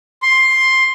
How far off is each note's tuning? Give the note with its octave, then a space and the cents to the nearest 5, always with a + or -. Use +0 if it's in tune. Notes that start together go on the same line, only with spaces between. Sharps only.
C6 +10